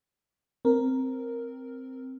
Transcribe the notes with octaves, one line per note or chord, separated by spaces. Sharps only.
C4 A#4